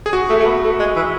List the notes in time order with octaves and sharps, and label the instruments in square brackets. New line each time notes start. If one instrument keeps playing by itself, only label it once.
[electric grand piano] G#4
F#4
[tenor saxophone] A3
A3
B3
A3
G#3
E3